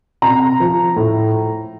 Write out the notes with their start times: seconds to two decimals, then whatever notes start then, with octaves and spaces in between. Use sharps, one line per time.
0.22 C3 A#5
0.60 F3
0.96 A2